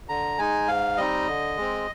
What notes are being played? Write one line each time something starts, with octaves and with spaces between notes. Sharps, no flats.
D3 A#5
G#3 D#4 G#5
G#2 F5
G3 C4 D#4 D#5
D3
G#3 C4